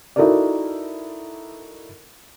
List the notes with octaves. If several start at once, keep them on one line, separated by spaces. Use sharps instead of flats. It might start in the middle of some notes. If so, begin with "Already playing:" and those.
D#4 E4 F#4 A4 A#4 D5